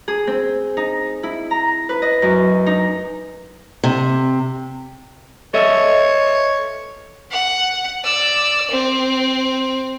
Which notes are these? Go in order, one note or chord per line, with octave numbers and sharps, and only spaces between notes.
G#4
C4
D#4
E4
A#5
B4
D#5
F#2
D#4
C3
A4 C#5 D#5 E5
F#5
D5 E6
C4